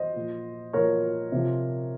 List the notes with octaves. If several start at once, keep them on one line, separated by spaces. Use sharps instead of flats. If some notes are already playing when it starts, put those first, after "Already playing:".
Already playing: C5 D#5
A#2 F3
A#2 F3 A#4 C#5
C3 F3